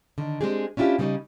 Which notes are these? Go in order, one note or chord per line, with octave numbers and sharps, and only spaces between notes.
D3 D#3
G#3 A#3 C4 D4 G4 G#4
C#4 D4 E4 F4 G4
C#3 G3 A#3 C4 C#4 D#4